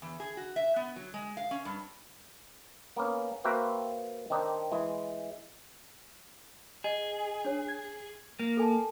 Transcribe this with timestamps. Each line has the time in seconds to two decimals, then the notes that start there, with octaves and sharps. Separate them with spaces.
0.02 E2
0.20 G#4
0.37 F#4
0.56 E5
0.76 B3
0.96 F#3
1.14 G#3
1.37 F5
1.51 C#4
1.65 G2
2.96 A#3 B3 C#4
3.44 A#3 C4 F#4 B4 C5 E5
4.30 D#3 C4 D4 D#4
4.72 E3 G#3
6.84 G#4 D#5
7.45 D4 C#5
7.68 G#6
8.39 A#3
8.57 A4 G#5 A5